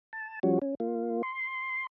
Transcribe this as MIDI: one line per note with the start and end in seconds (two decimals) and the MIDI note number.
0.13 0.39 81
0.43 0.59 53
0.43 0.59 55
0.43 0.59 61
0.43 0.59 66
0.62 0.75 61
0.80 1.22 58
0.80 1.22 65
1.23 1.87 84